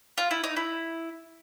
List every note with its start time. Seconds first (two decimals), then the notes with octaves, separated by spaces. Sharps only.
0.18 F4
0.31 E4
0.44 D#4
0.56 E4